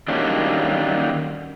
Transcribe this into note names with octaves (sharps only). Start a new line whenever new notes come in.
D#3 F#3 G3 A#3 C#4 D4